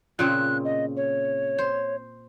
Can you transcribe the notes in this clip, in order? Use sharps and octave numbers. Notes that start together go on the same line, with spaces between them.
A#2 C#3 C4 F#6
D#5
C#5
C5